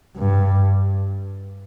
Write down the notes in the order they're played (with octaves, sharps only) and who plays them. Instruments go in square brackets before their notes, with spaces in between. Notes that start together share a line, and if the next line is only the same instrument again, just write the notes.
[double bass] G2